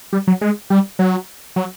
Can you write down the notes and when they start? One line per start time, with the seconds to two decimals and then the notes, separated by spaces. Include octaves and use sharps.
0.13 G3
0.27 F#3
0.41 G#3
0.70 G3
0.99 F#3
1.56 F#3